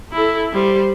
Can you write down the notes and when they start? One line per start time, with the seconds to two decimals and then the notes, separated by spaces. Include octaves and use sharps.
0.12 E4 A4
0.53 G3 C5